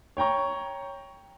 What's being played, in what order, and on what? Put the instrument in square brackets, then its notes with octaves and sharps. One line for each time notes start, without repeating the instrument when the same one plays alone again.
[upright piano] C#5 G5 A#5 C#6